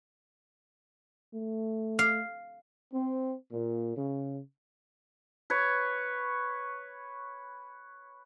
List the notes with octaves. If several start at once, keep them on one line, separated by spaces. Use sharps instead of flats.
A3
F5
C4
A#2
C#3
B4 C#5